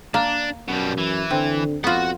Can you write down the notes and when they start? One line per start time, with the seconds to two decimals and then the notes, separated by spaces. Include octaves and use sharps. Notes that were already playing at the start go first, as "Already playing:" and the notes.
0.14 A#3 D4
0.68 F#2 B2 G3
0.98 E3
1.31 D3 C4
1.84 F2 B3 F4 F#4 F#5